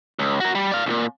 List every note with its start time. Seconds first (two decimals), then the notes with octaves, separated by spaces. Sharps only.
0.19 C#2
0.40 F#4 A#4
0.55 G3
0.72 D5 F5
0.86 B1 A#2